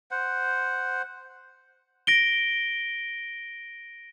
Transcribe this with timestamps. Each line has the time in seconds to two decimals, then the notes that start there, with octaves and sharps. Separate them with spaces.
0.11 C5 F#5
2.07 A#6 D7 G7